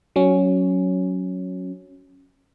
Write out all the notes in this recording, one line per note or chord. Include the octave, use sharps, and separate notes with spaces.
F#3 C#4